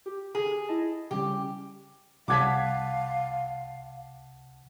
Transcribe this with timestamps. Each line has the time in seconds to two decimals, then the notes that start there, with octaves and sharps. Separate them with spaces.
0.06 G4
0.35 G#4
0.68 E4 D#5 A5
1.11 C#3 G3 C#4 G4
2.28 C2 F5 F#5 A5 D6 G#6 B6